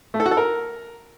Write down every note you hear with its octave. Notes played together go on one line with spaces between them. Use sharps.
A3
A4
F#4
A4
A#4